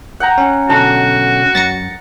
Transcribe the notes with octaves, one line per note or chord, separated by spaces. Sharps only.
F#5 G5 A#5
C#4
B1 D3 F#4 A5
F#2 A6 A#6 C#7